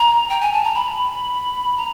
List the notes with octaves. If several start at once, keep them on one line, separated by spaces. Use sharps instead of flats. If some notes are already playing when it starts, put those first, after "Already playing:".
Already playing: A#5
G5
G#5
A5
A#5
B5
A#5